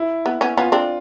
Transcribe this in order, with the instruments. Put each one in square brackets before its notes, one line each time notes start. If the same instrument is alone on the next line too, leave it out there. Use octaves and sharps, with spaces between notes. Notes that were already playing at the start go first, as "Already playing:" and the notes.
Already playing: [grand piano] E4
[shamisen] B3
B3 C#4
[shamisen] B3 C#4 [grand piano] F4
[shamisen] C4 D4